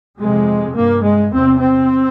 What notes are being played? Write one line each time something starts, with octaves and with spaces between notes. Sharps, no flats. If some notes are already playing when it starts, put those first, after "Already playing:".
F2 C3 G#3
G2 A#3
G#3
E2 C3 C4
C4